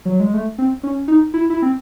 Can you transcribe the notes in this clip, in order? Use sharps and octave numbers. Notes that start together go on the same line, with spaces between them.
F#3
G#3
A3
C4
C#4
D#4
E4
E4
C4